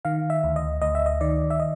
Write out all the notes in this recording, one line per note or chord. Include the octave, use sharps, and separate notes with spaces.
D#3 F5
E5
D2
D#5
D2 D#5
E5
D#5
D#3 D5
E5
D#5